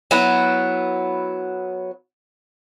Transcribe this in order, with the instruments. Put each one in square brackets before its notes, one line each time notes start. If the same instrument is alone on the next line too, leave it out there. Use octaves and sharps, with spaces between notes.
[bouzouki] F#3 B3 E4